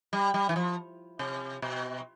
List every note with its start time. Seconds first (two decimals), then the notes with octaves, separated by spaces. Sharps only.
0.13 G3
0.34 G3
0.49 E3
0.56 F3
1.19 C3
1.62 B2